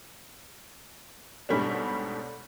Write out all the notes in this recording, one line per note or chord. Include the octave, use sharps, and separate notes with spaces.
G#2 B2 G3 A3 C#4 D4